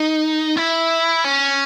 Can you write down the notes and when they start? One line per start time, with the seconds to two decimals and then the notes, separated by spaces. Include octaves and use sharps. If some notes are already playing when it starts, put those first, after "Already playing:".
Already playing: D#4
0.57 E4
1.25 C#4